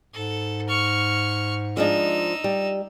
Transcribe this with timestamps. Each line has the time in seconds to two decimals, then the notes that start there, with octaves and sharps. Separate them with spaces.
0.14 G#2 A4
0.69 C#6 F6
1.77 F3 G#3 D4 D#4 E6
2.44 G3